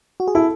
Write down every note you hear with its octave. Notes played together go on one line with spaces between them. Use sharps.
F#4
G#4
E4 A4